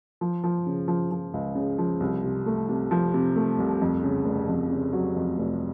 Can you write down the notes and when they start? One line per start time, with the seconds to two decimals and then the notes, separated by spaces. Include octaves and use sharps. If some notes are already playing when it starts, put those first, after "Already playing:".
0.21 F3
0.44 F3
0.66 C#3
0.88 F3
1.11 F3
1.34 C#2
1.55 C#3
1.78 F3
2.00 C2
2.24 C3
2.46 A3
2.69 C3
2.91 F3
3.14 C3
3.36 A3
3.58 C2
3.81 F2
4.03 C#3
4.26 F1
4.49 F2
4.71 C#3
4.93 F#3
5.16 F2
5.38 F1